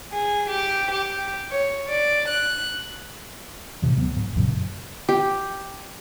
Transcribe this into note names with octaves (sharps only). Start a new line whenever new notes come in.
G#4
G4
G4
C#5
D5
F#6
F#2 A2 C3 E3
D2 F#3 B3
G#2
F#2 A#2 C#3 F#3
G4